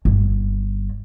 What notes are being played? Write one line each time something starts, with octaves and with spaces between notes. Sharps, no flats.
G1